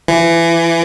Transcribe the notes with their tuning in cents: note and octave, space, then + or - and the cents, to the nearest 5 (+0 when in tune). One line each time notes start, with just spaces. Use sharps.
E3 +25